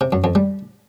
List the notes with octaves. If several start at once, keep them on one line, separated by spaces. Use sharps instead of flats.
C3
F#2
F2
G3